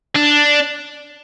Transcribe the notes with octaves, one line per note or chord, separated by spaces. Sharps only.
D4